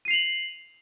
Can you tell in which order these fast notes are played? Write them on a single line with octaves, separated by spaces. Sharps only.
D#7 C7 F7 F#7